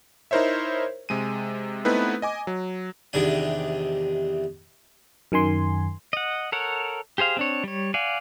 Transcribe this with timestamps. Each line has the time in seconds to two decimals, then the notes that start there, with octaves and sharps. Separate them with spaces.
0.31 D#4 E4 A#4 C5 C#5 E5
1.09 C3 G#3 D#7
1.85 A3 B3 C4 D#4 E4 B4
2.22 D#5 G#5 D6
2.47 F#3
3.13 E2 C3 D#3 D4 G#5
5.32 F#2 D#3 G#5 C6
6.13 D#5 F#5
6.52 A4 A#4 C#5 F#5
7.18 G4 G#4 C5 F5
7.37 C4 D4 C#5
7.64 G3 C#5
7.94 D5 F5 F#5 G#5